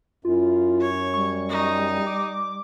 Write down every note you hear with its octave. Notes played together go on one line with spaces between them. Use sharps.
F#2 E4 F4
C#5
G3 C#6
D#4
D6